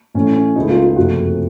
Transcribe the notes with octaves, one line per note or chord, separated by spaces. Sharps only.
A1 A2 A3 C#4
C#4
C#2 C#3 A3 D#4
F4
F4
F#1 F2 C3 F3 A3 F#4